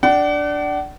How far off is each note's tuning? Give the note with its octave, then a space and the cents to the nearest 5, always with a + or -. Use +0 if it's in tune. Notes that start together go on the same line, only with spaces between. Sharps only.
D4 +0 F#5 +40